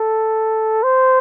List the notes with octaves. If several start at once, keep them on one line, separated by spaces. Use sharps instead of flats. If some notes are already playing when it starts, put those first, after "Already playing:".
Already playing: A4
C5